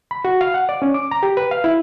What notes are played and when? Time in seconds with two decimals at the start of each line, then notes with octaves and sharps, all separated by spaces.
0.11 B5
0.25 F#4
0.41 F5
0.54 F#5
0.69 D5
0.82 C#4
0.94 D6
1.11 A#5
1.23 G4
1.37 B4
1.51 F5
1.64 E4